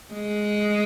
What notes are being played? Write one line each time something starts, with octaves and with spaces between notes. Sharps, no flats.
G#3